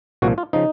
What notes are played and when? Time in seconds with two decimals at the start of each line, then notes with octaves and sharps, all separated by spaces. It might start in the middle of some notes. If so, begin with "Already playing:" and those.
0.22 C2 A#2 F3 F#4
0.38 F4
0.53 C#3 F3 D#4